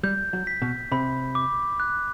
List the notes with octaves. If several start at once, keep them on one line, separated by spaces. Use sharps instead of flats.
G3 G6
F#3
B6
B2
C3 B5
D6
F#6